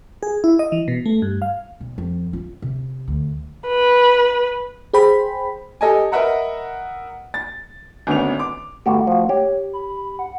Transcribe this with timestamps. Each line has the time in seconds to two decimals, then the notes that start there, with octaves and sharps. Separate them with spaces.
0.23 G#4
0.44 E4
0.59 D#5
0.72 E3
0.88 B2
1.06 A3
1.22 G2
1.42 F5
1.81 B1
1.98 F2
2.33 F4
2.62 C3
3.08 D2
3.68 B4
4.93 G#4 C5 G5 B5
5.81 G4 A4 D#5 G#5
6.12 A#4 B4 D#5 E5 F#5 A#5
7.34 A6
8.07 G#1 D2 B3 C#4 D4 F7
8.39 D6
8.86 G1 A3 F#4 G4
9.07 F3 F#4
9.29 G4 C#5
9.73 B5
10.19 F#5